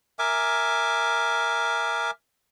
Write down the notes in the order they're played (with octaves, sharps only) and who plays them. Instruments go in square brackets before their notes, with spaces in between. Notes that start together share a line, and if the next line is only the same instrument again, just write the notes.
[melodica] A#4 E5 G#5 D6